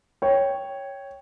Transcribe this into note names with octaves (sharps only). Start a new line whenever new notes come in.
C#5 G5